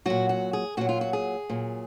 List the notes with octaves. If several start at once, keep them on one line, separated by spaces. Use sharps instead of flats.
A#2 F#3 F#4
F#4
G#4
A#2 F#3 F#4
F4
F#4
G#4
A#2 F#3